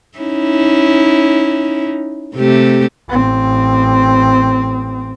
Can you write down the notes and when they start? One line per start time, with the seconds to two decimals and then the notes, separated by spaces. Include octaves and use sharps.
0.19 C#4 D#4 E4
2.35 C3 A3 G4
3.09 A1 C4